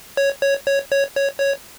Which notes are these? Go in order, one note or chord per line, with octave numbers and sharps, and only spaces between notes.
C#5
C#5
C#5
C#5
C#5
C#5